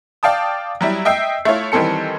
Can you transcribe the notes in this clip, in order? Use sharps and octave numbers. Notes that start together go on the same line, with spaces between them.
D5 F5 G5 A5 D#6
F#3 G3 E4
D#5 E5 G5 E6 C7
A3 E4 F4 C#5
D#3 E3 G3 C4 A4 C#7